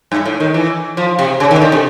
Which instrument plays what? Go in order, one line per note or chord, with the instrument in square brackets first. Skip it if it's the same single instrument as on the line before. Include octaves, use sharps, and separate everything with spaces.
[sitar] G2
A2
D#3
E3
F3
C3
C#3
D#3
D3
C3